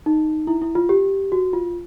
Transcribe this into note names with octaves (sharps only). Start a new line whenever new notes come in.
D#4
E4
E4
F4
G4
F#4
F4